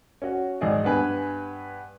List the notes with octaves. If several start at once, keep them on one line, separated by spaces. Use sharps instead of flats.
C#4 F#4
G#1 G#4 D5 D#5
G2 B3 B4 G#5